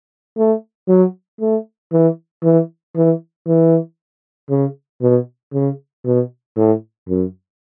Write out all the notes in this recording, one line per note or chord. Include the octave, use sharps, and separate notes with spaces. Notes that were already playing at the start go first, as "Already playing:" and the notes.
A3
F#3
A3
E3
E3
E3
E3
C#3
B2
C#3
B2
A2
F#2